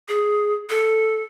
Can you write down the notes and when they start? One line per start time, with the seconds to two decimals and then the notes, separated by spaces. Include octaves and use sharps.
0.08 G#4
0.70 A4